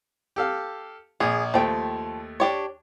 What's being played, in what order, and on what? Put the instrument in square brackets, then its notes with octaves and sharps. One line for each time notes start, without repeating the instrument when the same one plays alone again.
[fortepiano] G4 A4 F5
[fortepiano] A#1 [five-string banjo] G#4
[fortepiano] D#2 A3 [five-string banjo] F3 G5
[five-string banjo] D4 G4 C#5